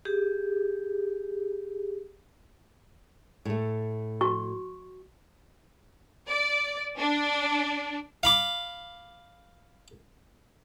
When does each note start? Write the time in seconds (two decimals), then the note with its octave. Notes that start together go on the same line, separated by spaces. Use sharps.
0.05 G4 G#4
3.45 A2 A3
4.21 F#4 C#6
6.29 D5
6.98 D4
8.23 F5 B5 D6